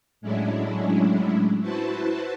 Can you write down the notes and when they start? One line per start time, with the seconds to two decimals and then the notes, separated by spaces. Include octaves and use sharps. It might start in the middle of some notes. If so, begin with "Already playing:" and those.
0.21 A2 F#3 G#3 C#4 D4 E4
1.61 E4 F#4 B4 C5 A5